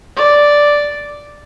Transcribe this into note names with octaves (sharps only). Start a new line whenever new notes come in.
D5